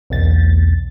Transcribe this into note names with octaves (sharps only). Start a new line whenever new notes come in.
B1 E2 A6